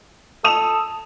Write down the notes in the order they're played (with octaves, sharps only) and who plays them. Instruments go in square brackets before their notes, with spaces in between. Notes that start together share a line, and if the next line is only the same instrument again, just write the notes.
[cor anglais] A4 [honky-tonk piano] D#6 E7 F7